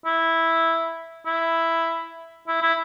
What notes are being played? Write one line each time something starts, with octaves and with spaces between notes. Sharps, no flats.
E4
E4
E4
E4